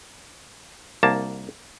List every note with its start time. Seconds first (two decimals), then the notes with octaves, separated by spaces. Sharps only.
1.03 C2 A#3 A5